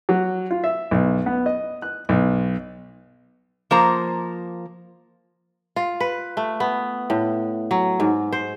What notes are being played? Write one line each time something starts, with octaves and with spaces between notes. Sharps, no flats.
F#3
F4
E5
B1
B3
D#5
F#6
B1
F3 A#3 C5 A#5
F4
B4
A3
B3
A2
F#3
G#2
C5